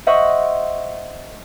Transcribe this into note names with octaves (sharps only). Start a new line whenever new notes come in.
C5 D#5 E5 F#5 C#6 F#6